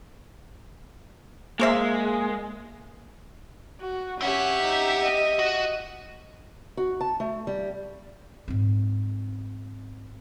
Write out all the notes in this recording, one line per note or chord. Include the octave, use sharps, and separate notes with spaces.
G#3 A#3 A#4 C5 E5
F#4
C4 C#4 G4 E5 F#5
D#4
D#5
F#4
F#4
A5
A3
G3
G#2 C4